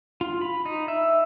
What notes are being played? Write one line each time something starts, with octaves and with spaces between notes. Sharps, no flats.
F4
B5
D#4
E5